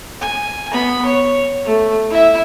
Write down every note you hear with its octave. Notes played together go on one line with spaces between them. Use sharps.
G#5
B3 B5
C#5
A3
E4 E5